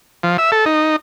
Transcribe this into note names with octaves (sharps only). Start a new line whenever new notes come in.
F3
E5
A4
D#4